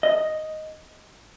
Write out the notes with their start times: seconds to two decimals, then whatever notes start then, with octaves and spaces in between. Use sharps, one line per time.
0.03 D#5